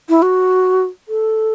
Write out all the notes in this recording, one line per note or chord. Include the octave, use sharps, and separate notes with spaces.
E4
F#4
A4